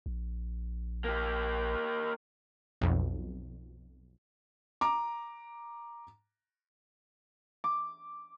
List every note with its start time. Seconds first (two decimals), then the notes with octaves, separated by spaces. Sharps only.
0.06 A#1
1.04 A#3 G4
2.81 B1 F2
4.81 A#5 D6
7.64 D6